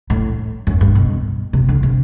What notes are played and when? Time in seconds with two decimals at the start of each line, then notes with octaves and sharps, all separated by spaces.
0.10 A2
0.67 F#2
0.81 G2
0.95 B2
1.53 C3
1.69 D3
1.83 C3